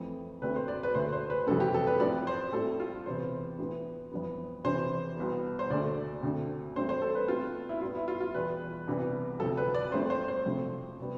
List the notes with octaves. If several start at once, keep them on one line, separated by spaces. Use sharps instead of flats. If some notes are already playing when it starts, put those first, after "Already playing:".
Already playing: F2 E3 A3 C4
D2 D3 A3 C4 B4
C5
D5
B4
D2 D3 A3 C5
C5
B4
F2 C3 E3 A3 C4 A4
G4
A4
B4
A2 F3 C4 D5
C5
A2 G3 C4 A4
F4
E2 C3 E3 B3 C5
A2 E3 B3
F2 E3 B3
E2 C3 E3 C5
C2 B2 B3
C5
D2 D3 A3 D5
D2 D3 A3 C4
G2 E3 A3 C4 C5
C5
A4
B4
B2 A3 C4 F4
E4
A2 G3 B3 F4
E4
F4
F4
E2 B2 G3 B4
C2 C3 E3 G3 B3
D2 C3 F3 C4 A4
B4
D5
G2 F3 A3 C4 C5
C5
C5
F2 C3 F3 A3 C4
C3 G3 B3